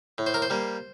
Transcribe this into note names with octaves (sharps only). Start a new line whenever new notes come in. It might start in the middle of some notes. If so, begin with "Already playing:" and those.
A2
C5
A#4
C5
G3 A#3